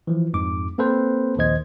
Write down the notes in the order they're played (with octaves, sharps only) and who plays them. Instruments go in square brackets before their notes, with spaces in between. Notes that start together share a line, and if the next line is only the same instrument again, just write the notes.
[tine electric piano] E3 F3
F2 G#2 D6
A#3 C4 A4 B4 C5
A#1 D#2 D#3 C5 D#5 G#6